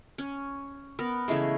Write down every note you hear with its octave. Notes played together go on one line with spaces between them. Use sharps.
C#4
B3 A#4
C#3 E3 G#3 A3